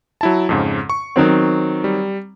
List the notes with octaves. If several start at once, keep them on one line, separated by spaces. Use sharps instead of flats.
F#3 E4 A5
F2 G#2 C#3
C#6
D#3 F#3 C4
G3